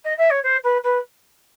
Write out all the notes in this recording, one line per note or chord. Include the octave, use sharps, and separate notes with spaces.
D#5
E5
C#5
C5
B4
B4